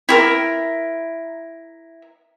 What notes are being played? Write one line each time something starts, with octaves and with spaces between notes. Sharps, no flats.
E4 G4 A#4